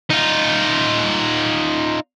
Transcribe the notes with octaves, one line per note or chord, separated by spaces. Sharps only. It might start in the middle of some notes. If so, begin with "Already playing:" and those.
D#4 F4